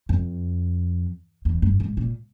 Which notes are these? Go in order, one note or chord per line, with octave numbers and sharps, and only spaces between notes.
F2
E2
G2
G#2
A#2